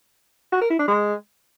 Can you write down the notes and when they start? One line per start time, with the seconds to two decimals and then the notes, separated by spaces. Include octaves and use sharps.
0.53 F#4
0.62 A#4
0.70 E4
0.79 D4
0.88 G#3